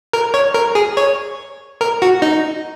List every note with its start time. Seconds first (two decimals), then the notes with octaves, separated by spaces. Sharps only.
0.13 A#4
0.34 C#5
0.54 A#4
0.75 G#4
0.97 C#5
1.81 A#4
2.02 F#4
2.22 D#4